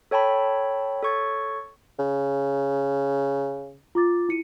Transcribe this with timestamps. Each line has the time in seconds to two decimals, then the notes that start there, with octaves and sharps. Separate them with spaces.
0.11 A4 C#5 G5 A5 B5
1.03 A4 C#5 C#6 G#6 A6
1.99 C#3
3.95 F4 D6 A6
4.29 E4 C#7 D#7